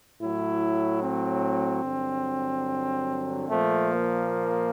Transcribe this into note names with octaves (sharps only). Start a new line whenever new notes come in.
A2 F#3 E4
C4
G2 D3 F#3
A#2 F3 A3
A#3